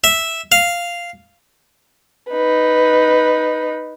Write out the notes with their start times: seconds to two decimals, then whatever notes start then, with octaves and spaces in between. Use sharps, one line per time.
0.04 E5
0.52 F5
2.31 D#4 B4